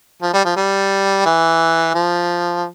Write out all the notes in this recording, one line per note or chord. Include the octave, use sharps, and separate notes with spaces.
F3
G3
F3
G3
E3
F3